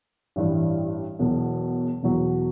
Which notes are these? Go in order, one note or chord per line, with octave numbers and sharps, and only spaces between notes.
A1 G2 E3 G3
E1 E2 B2 F#3
E1 E2 B2 F#3